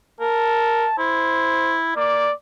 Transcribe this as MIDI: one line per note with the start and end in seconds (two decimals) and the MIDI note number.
0.21 0.87 70
0.21 0.95 81
0.99 1.92 64
0.99 1.78 72
1.96 2.28 58
1.96 2.32 74